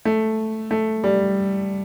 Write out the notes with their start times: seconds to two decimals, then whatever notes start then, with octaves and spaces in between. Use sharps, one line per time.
0.05 A3
0.71 A3
1.04 G3